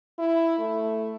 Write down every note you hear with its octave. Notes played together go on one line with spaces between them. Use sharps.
E4
A3